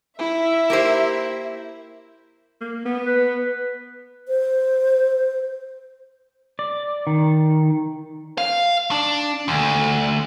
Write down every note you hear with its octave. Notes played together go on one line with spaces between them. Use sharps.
E4 E5
A#3 G4 C5
A#3
B3
B4
C5
D5
D#3
F5
D4
D2